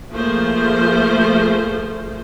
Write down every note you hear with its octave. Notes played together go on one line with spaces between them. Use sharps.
F3 A3 A#3 F4 G#4 C5